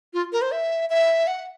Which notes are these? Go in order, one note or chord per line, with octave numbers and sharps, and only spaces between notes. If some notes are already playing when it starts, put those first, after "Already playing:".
F4
A#4
C5
E5
E5
F#5